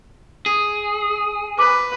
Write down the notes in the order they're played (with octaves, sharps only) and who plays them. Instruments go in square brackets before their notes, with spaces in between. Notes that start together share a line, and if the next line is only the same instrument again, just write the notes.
[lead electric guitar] G#4
[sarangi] B4 [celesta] D6